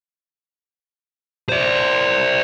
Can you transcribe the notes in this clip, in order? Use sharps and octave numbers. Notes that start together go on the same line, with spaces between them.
C5 D5